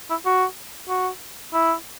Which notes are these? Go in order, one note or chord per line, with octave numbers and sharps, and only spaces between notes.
E4
F#4
F#4
E4